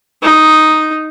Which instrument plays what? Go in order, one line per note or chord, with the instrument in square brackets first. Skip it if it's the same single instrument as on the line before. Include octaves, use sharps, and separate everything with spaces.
[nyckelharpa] D#4